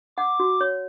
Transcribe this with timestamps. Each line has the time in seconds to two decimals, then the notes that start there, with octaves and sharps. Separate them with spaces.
0.18 F#5 D6
0.40 F#4
0.61 C#5